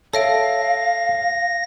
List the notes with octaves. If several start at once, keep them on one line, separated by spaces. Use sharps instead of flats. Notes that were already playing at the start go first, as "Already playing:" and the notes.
A4 C#5 E5 F5 A#6 D7